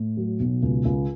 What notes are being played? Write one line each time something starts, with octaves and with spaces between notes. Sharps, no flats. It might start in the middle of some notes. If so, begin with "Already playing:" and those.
Already playing: A2
F#3
B1
C#2
C#2